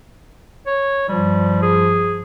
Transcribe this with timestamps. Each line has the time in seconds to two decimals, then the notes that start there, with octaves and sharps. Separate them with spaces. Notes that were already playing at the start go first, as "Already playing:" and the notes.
0.66 C#5
1.08 G2 F3 G3
1.62 G#4